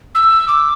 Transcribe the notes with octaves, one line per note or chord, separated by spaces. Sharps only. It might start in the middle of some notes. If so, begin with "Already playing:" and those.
E6
D6